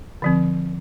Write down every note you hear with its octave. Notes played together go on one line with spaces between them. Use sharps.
D3 F3 C4